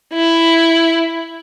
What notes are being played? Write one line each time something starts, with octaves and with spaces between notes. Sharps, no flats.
E4